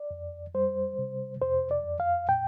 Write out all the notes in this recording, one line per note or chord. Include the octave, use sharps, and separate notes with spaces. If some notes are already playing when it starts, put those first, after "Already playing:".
Already playing: D5
F2
G3 C5
C3
F2 C5
D5
F2
F5
A#2 G5